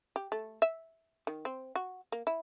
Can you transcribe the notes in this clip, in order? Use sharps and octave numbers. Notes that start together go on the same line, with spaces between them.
G4
A3
E5
D#3
C4
F#4
A#3
E4